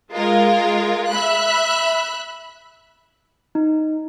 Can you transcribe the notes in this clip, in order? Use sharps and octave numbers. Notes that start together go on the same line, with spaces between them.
G#3 F4 A#4
E5 B5 F#6
D#4